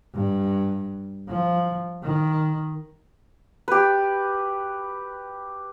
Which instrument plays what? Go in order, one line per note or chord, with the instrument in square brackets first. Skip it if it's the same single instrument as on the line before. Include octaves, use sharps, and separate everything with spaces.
[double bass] G2
F3
D#3
[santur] G4 B4